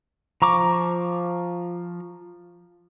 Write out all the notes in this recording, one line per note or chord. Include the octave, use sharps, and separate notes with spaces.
F3 A#5 C#6 D6